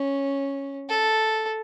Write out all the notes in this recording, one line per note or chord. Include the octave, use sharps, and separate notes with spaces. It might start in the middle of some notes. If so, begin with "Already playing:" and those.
Already playing: C#4
A4